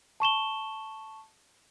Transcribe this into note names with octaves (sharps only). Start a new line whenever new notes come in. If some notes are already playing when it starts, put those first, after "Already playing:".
A5 C#6 E7 G7